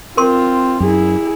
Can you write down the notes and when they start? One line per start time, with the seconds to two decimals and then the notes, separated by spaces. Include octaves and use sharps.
0.17 C4 F4 A#4 C6
0.80 F#2 E4 G#4